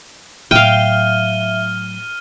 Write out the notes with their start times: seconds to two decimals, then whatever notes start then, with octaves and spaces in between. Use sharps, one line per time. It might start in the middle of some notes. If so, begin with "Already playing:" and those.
0.51 A2 F#3 E5 F5 G5 F6 D#7 G7